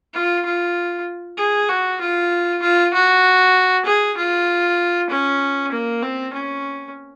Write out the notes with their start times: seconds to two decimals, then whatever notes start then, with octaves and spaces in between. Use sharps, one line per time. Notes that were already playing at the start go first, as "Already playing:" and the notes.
0.14 F4
0.45 F4
1.38 G#4
1.69 F#4
2.01 F4
2.62 F4
2.94 F#4
3.85 G#4
4.17 F4
5.10 C#4
5.72 A#3
6.02 C4
6.34 C#4